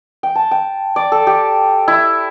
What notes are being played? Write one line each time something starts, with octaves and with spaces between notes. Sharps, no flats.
G5
A5
G5
D5
A4
G4
E4